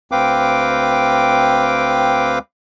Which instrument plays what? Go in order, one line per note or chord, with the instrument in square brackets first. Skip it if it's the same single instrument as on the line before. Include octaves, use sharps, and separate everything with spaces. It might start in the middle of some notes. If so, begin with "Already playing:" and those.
[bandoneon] D2 C4 B4 F5 G5 D6